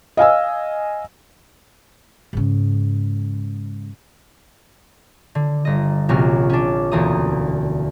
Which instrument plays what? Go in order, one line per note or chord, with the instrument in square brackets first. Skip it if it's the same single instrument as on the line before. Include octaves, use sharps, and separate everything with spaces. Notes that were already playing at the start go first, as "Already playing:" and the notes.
[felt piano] D#5 F5 G#5 E6
[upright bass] G#2 C#3
[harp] D3
G1 D#5
A#1 C3 C#4 F#4 F6
C#4 D4
E1 D2 A#3 D#6